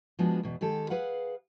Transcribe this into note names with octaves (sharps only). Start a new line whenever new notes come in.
F3 G#3 B3 D4 F#4 G#4
E2 B2
D#3 G#3 G4 A4
G#4 B4 F5 F#5